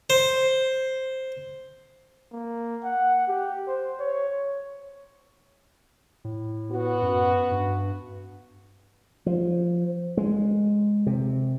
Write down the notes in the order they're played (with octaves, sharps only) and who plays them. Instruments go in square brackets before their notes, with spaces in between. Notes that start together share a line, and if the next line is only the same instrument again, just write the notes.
[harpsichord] C5
[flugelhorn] A#3
F#5
G4
C5
C#5
[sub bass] A2
[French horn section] B3 F#4
[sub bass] F#2
G2
[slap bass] F3
G#3
C3